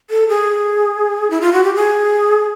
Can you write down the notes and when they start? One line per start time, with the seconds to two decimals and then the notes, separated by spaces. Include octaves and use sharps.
0.10 A4
0.29 G#4
1.30 E4
1.41 F4
1.53 F#4
1.64 G4
1.75 G#4